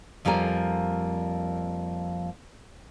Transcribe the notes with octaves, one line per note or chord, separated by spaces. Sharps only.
F2 F3 G3 A#3 A#4 G#5